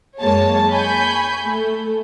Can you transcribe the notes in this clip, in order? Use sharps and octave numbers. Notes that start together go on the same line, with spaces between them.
F#2 G#3 A#3 C#5 A5
G#5 B5 C#6 G6
A3